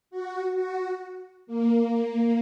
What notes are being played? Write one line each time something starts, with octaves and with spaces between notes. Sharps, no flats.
F#4
F#4
A#3